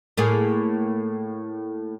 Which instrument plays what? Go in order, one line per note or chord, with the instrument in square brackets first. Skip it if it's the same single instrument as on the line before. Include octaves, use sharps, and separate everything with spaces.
[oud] A2 A#3 G#4